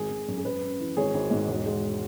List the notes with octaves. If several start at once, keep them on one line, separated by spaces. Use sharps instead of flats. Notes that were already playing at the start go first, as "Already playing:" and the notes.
Already playing: G#1 G#4
G#1
F#2
G#4
F#2 B4
C#4
E3
G#1 G#4 C#5
G#1
G#2
E1
G#3